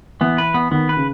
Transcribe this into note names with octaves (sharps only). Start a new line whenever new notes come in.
E3 B3
B4
B3
D#3 B3
B4
C#3